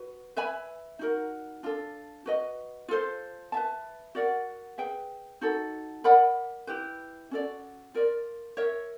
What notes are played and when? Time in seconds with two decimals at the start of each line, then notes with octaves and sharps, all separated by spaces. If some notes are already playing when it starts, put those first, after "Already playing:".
Already playing: F#4 B4
0.37 B4 E5 G#5 B5
0.99 D#4 F#4 A#4
1.63 D4 F4 A4
2.26 F#4 B4 D#5
2.88 F4 A4 C5
3.52 B4 E5 A5
4.15 F#4 A#4 D5 F#5
4.78 G#4 B4 E5 G5
5.41 D#4 F#4 A4
6.04 A#4 D5 F#5 B5
6.67 E4 G4 B4
7.31 C#4 F#4 A4 D5
7.94 F4 A#4 D5
8.57 A#4 C#5 E5